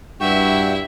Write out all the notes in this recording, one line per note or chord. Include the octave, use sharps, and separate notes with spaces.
G2 E4 F#4 E5 G5 C#6